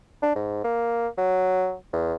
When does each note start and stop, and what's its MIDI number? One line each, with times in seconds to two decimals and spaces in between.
0.22 0.33 62
0.35 0.64 44
0.64 1.08 58
1.18 1.74 54
1.93 2.14 40